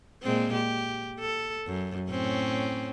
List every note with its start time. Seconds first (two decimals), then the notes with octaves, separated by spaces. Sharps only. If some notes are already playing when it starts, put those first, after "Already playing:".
0.23 A#2 G#3 C4
0.53 G4
1.19 A4
1.66 F#2
2.09 A2 C4 C#4